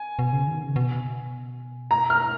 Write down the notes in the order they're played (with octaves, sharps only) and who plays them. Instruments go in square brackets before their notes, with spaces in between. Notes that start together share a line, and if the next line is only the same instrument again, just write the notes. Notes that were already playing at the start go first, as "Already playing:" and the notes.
Already playing: [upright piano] G#5
[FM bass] B2
C#3
D#3
C#3
B2
[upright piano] A#5
F6